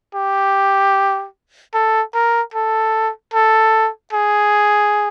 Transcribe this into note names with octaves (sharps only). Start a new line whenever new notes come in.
G4
A4
A#4
A4
A4
G#4